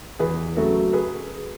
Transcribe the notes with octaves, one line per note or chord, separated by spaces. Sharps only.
E2 G#4 B4
C#3 F#3 A3 F#4 A4
G#4 B4